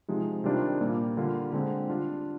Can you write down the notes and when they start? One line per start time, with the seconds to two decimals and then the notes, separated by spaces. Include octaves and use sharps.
0.08 C3 F3 G#3 D#4 G4
0.44 C3 D#3 G3 D4 F4
0.81 A#2 G3 A#3
1.17 D3 G3 A#3 F4
1.53 D3 G#3 C4
1.90 G3 D4 F4